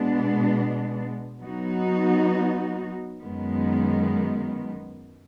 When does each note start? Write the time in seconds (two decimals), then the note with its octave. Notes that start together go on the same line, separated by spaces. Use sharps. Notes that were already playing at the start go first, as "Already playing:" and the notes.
Already playing: B2 G#3 B3 D4
1.41 F#3 B3 D#4 F#4
3.22 F#2 D#3 G#3 B3